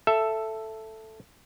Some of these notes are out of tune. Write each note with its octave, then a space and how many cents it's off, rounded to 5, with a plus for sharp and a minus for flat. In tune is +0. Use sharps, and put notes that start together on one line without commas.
A4 +0 E5 +10